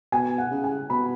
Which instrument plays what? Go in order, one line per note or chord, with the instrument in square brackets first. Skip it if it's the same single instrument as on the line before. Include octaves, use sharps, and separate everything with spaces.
[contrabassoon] B2 [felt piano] G#5
[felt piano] F#5
[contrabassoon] C#3
[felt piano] G#5
[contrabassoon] B2 [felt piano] B5